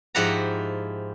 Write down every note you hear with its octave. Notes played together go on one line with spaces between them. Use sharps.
G#2 F3 E4 G4 F#5 A#5